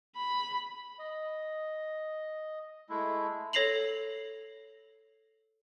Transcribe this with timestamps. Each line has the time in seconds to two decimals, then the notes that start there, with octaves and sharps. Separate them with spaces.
0.16 B5
0.99 D#5
2.89 G#3 A3 E4
3.53 A4 C#5 A#6 C7 F7 F#7